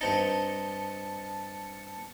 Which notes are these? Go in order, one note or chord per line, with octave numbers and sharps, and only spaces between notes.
G2 C4 D#4 A5 C#7